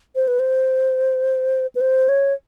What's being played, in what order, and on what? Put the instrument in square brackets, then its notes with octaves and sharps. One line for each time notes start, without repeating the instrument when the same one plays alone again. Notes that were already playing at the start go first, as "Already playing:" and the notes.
[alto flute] C5
B4
C5
B4
C5
C#5